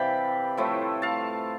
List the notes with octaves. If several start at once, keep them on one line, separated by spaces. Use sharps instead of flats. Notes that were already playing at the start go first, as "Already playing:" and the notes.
Already playing: C3 E3 G3 F5 G5 A5 B5
A2 F3 A3 E4
F5 A5